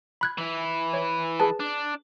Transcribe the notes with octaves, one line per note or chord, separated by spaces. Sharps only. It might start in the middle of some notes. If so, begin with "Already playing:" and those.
B5 F#6 G#6
E3 E4
C#5
G#4 B4 A5
D4